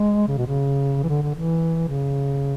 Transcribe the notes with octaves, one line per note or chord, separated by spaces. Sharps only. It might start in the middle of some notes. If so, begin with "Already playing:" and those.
Already playing: G#3
C#3
B2
C#3
E3
D3
D3
E3
C#3